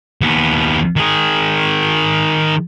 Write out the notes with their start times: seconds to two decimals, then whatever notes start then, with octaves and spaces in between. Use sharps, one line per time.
0.21 D#2 B3
0.96 D#3 G#4